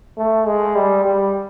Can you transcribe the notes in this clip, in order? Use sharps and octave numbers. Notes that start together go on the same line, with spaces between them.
A3
G#3
G3
G3